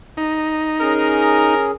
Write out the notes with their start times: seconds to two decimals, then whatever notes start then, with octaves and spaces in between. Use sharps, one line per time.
0.17 D#4
0.81 C#4 G#4 A#4